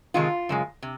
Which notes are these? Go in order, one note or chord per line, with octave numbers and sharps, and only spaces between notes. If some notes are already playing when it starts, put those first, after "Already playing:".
F2 C3 D#3 G#3 F4
F#2 C#3 G#3
C3